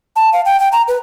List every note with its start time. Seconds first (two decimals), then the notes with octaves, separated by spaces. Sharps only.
0.16 A5
0.33 F5
0.45 G5
0.60 G5
0.72 A#5
0.88 B4